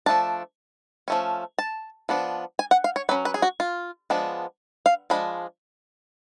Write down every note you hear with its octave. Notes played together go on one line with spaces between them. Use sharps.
F3 A3 D4 A5
F3 A3 C#4
A5
F3 B3 D4
G#5
F#5
F5
C#5
F#3 C#4 B4
B4
G#4
F#4
F4
F3 G#3 B3 D4
F5
F3 G#3 D4 B5